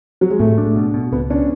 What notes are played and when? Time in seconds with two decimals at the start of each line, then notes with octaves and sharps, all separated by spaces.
0.21 F#3
0.30 G#3
0.39 A2 A3
0.58 D4
0.76 B2
0.94 B2
1.12 C#2 B3
1.30 C#4 D4